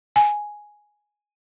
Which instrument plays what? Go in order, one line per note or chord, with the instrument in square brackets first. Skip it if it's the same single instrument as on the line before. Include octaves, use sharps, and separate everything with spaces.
[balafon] G#5